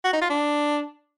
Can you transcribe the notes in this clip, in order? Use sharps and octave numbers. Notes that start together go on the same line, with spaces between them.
F#4
D#4
F4
D4